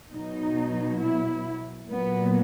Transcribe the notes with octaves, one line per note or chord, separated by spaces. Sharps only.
B2 F#3 D#4
E4
A#2 F#3 B3